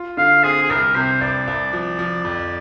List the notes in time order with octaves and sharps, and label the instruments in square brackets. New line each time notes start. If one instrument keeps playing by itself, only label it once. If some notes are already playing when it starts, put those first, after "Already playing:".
Already playing: [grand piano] F4
[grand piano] D3 [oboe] F5
[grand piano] C4 [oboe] G#4
[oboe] G#4
[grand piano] C2 [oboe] A#4
[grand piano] C3 [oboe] C5
[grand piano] C2 [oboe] D5
[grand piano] C2
F3
F3
F2